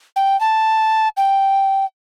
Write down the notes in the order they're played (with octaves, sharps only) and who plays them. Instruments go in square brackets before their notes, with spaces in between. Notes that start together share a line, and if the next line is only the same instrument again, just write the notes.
[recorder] G5
A5
G5